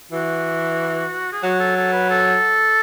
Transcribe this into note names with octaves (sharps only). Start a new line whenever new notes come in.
E3 F#4
G#4
F#3 F#4
A4
A4
B4
A4